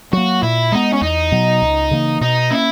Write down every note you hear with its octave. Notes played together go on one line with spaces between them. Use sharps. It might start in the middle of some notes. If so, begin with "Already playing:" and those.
F#3 A#3 F#4
A#2 E4
G#3 B3 D#4
C#4
E2 D#4
B2 F#3
C#2
C#3 E3 A#3
B2 D#4
A#3 C#4 E4